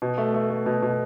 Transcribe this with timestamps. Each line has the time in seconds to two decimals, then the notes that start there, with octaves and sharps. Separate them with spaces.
0.02 B2
0.18 A3
0.34 A3
0.50 A3
0.66 B2
0.82 B2